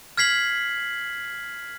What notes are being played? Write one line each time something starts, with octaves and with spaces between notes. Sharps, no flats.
F6 G#6 B6 C7 F#7